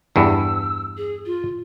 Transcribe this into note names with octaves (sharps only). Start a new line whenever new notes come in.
E2 G2 E6
G#4
F4